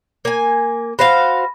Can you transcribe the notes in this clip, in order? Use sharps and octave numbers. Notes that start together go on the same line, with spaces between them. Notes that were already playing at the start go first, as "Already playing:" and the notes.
A#3 G#5
F#4 C5 F5 B5 A#6